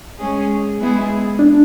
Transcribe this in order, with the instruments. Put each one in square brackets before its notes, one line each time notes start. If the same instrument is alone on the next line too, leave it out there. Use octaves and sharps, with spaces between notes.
[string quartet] G#3 C#4 G#4
G#3 B3 E4 G#4
[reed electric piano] D4